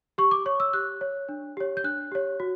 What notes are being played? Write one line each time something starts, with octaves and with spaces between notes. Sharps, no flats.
G4 C#6
D6
C#5 C#6
E6
G4 F#6
C#5
D4
G4 C#5
G6
D4 F#6
G4 C#5
F#4